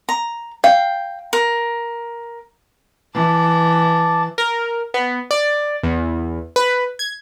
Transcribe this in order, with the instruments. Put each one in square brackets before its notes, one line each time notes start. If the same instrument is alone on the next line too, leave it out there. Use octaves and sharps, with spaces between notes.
[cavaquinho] A#5
[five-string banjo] F5 [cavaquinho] G5
[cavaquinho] A#4
[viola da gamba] E3 [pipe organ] A5 D6 A6
[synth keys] A#4
B3
D5
E2
B4
G#6